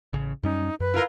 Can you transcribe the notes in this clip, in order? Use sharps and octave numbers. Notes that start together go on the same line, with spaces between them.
A1 C#3
F#2 G3 C#4 D#4
F#2 B4
E4 F4 A#4